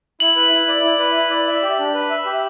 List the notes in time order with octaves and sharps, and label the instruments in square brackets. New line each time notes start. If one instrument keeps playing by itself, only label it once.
[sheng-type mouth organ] E4 [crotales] F#7
[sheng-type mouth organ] B4
E4
D5
E4
B4
E4
D5
E5
G4
D4
B4
E5
G4